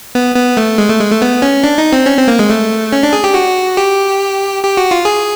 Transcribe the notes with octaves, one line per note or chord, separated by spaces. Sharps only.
B3
B3
A3
G#3
A3
G#3
A3
B3
C#4
D4
D#4
C4
C#4
C4
A#3
G#3
A3
C#4
D4
G#4
G4
F#4
G4
G4
F#4
F4
G#4